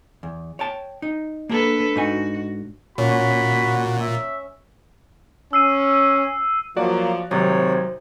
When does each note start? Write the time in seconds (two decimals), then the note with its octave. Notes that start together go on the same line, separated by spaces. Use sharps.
0.23 E2
0.59 C#5 G5 A5
1.02 D#4
1.49 A#3 D4 G#4 A4 B4
1.96 G#2 D#4 F#4 G#5
2.98 A#2 C#4 F#4 B5
4.01 E5
5.53 C#4 E6 C7 D#7
6.77 F3 F#3 A#3 F#4 D5
7.31 G#1 C3 F#3 C5 C#5